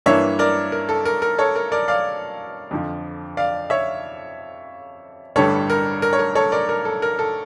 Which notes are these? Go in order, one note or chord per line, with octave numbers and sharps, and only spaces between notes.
G2 E3 A#3 D4 C#5 E5
A#4 D5
A#4
A4
A#4
A#4
A4 C#5
A#4
A#4 D5
D5 F5
F2 D3 F3
D5 F5
C#5 E5
A1 G2 D3 G3 A4 C#5
A#4
A#4
C#5
A#4
A4 C#5
A#4 D5
A#4
A4
A#4
A4